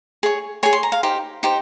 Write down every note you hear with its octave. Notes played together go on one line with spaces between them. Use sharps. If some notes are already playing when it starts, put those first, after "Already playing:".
G#4 C#5
G#4 C#5 G#5
C6
A#5
F5
D#4 G4 C5
D#4 G4 C5